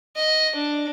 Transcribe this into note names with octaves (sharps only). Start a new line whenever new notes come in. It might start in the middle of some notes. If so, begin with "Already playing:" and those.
D#5
D4